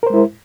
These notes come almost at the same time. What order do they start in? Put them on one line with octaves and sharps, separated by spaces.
A#4 C5 G#3 E4